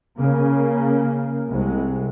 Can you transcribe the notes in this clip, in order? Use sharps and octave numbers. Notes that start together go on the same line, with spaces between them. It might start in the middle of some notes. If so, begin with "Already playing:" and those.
C#3 A#3
C2 G#3